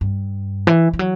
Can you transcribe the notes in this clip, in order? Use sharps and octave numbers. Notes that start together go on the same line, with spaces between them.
G2
E3
E3
F#3